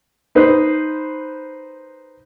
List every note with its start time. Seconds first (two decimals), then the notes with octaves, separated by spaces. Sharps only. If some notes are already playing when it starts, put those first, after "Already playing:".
0.35 D#4 B4 C5